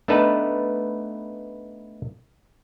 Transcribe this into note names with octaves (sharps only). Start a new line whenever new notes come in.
A3 B3 D4 D#4 B4 A5